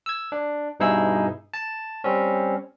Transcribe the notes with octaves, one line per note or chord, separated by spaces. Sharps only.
E6 G#6
D4
G2 B2 D#4 E4 G#4 E6
A5
G3 C4 C#4